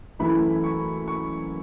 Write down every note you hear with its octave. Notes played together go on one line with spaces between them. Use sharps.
F#2 E3 A3 E4 B5
C#6
C#6